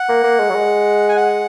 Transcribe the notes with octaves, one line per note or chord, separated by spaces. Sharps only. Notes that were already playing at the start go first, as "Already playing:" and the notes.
Already playing: F#5
A#3
A#3
G#3
F#3
G#3
G#5
F#5